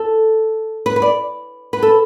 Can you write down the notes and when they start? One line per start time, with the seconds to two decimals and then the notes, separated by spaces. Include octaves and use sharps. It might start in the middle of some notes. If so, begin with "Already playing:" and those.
Already playing: A4
0.86 B4
0.96 B4
1.02 D5
1.73 B4
1.83 A4